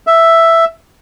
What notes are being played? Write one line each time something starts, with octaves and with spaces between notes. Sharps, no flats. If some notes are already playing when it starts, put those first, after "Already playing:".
E5